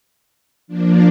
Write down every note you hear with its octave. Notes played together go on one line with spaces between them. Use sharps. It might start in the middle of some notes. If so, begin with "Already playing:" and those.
F3 A#3 D4